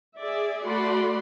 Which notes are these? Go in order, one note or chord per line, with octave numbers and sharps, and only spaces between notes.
G#4 D5 E5
A3 F#4 D5 B5 C6